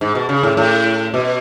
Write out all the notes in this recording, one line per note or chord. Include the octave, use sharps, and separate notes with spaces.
G#2
B2
C#3
A2
A2
B2